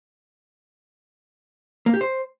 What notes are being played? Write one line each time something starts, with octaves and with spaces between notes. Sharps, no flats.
A#3
G4
C5